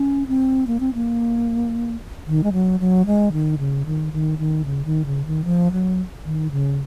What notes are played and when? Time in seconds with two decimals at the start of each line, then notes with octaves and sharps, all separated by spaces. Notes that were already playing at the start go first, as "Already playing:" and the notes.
Already playing: C#4
0.28 C4
0.67 A#3
0.80 C4
0.94 A#3
2.27 D#3
2.44 G#3
2.53 F#3
2.80 F#3
3.06 G#3
3.32 D#3
3.59 C#3
3.86 D#3
4.13 D#3
4.38 D#3
4.65 C#3
4.85 D#3
5.06 C#3
5.26 D#3
5.45 F3
5.72 F#3
6.25 D#3
6.51 C#3